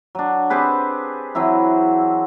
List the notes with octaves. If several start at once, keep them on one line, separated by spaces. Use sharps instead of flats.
F#3 D4
C4 G4 G#4 B4
E3 F#3 C4 E4